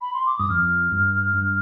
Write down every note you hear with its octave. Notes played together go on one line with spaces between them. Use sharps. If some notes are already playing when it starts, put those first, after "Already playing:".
B5
C6
D6
G2 D#6
F2 F6
G2
G2